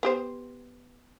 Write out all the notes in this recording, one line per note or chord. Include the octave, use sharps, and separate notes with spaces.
B3 G4 C5